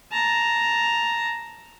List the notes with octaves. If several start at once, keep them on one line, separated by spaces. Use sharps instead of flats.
A5 A#5